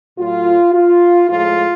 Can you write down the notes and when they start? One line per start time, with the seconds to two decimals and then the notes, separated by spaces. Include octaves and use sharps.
0.18 A2 F#3 F4
0.74 F4
1.29 A2 F3 G#3 F4